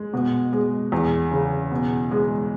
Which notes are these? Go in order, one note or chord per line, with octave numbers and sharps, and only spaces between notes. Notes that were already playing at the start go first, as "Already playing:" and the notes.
Already playing: G#3
B2
G#3
E2
C#3
B2
G#3